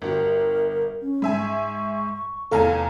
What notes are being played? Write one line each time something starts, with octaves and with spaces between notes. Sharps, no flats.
G1 F#4 G4 A#4
C#4
G#2 E5 G#5
C#6
F1 E2 A4 F5 G#5 A#5